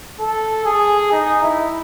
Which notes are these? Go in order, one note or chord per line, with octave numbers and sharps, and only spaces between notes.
A4
G#4
D#4
E4